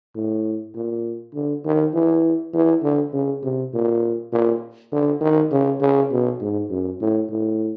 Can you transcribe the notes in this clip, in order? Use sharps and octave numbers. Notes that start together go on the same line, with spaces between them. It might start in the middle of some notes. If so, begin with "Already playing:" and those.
A2
A#2
D3
D#3
E3
E3
D3
C#3
C3
A#2
A#2
D3
D#3
C#3
C#3
B2
G#2
F#2
A2
A2